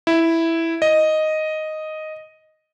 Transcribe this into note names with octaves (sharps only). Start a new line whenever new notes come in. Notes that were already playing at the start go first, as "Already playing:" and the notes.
E4
D#5